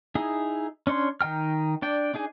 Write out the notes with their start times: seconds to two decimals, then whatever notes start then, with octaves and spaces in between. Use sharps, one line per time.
0.15 D#4 E4 G#4
0.87 C#4 D4 C#5 C6
1.21 D#3 D#4 G5 F6
1.82 D4 D5 G5
2.14 D4 D#4 G#4 G#5